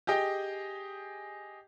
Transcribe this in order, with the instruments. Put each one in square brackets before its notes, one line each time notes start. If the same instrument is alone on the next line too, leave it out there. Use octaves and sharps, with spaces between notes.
[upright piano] G4 G#4 D#5 G5